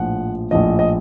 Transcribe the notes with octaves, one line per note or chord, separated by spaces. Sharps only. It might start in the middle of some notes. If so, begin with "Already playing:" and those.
Already playing: A#1 A2 F3 F#5
A#1 A2 F3 D#5
D#5